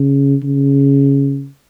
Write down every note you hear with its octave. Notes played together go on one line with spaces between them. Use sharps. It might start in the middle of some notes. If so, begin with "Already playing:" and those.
Already playing: C#3
C#3